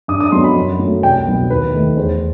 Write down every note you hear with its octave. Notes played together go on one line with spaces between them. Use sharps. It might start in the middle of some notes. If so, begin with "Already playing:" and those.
G2 D#6
D#6
F#3 B3 C6
B5
F#2
F#3
A3
C2 G5
B2 F#3 B3
D#2 B4
D#3 A3
E2 C5